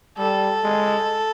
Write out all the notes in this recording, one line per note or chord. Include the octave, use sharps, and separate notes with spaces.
G3 A4
G#3